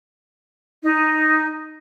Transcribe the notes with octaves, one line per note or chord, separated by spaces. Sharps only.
D#4